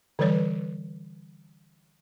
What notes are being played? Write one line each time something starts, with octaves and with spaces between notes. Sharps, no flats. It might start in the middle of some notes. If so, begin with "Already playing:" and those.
D3 E3 G3 B4 C#5